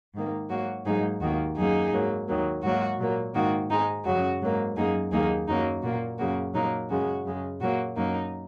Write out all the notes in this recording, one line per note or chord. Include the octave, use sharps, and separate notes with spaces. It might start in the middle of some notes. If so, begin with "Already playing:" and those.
G#2 D#3 A#3
G#2 F#3 A#3 F#4
G#2 F#3 A#3 D#4 G#4
D#2 D#3 A#3 F#4
F#2 F#3 A#3 D#4 G#4
G#2 F#3 A#3
D#2 D#3 F#3 A#3
G#2 F#3 A#3 F#4
A#2 F#3 A#3
G#2 D#3 A#3 F#4
G#2 G#3 D#4
F#2 C#3 F#3 F#4
G#2 F#3 A#3
F#2 F#3 A#3 D#4 G#4
D#2 D#3 F#3 A#3 D#4 G#4
F#2 F#3 A#3 D#4
A#2 A#3 F#4
F#2 C#3 A#3 F#4
A#2 F#3 A#3 D#4
F#2 C#3 G#3 F#4
F#2 C#3 G#3
A#2 F#3 A#3 F#4
F#2 F#3 A#3 D#4